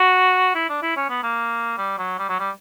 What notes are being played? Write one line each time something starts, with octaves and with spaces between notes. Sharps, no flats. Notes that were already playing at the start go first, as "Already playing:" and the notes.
Already playing: F#4
E4
D4
E4
C#4
B3
A#3
G3
F#3
G3
F#3
G3